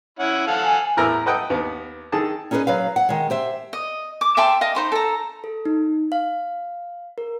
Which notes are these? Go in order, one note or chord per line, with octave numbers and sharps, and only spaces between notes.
C#4 E4 F#5
A4 F5 F#5
G#5
E2 A2 A#4 B4 A#5 E6
A4 B4 D#5 F#5 G5
D#2 B3
D#3 G#4 A4 A5 D#6
C#4 D#4 G#4 A#4 B4 D#5
F#3 B4 F5
F#5
D#3 G#3
G4 C5 E5
D#5
D6
E5 G5 A5 C6
D#5 F5
D#4 C5 B5
A4 A#5
A4
D#4
F5
A#4